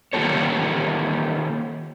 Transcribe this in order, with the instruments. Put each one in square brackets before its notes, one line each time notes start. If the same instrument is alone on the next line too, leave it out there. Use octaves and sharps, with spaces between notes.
[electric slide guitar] D#3 A#3 F4 G4 A4 C#5